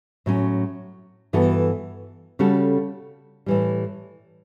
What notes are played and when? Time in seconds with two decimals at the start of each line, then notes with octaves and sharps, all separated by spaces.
0.26 A2 F#3 C#4
1.33 G2 E3 B3 F#4 A4
2.39 C#3 G3 C#4 F#4 A4
3.46 A2 E3 G3